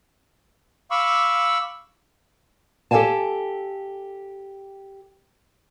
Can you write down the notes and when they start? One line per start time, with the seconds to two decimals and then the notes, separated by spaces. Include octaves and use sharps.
0.91 F5 B5 C#6 D6 E6
2.91 G4 A4 D5 F5 G#5 A5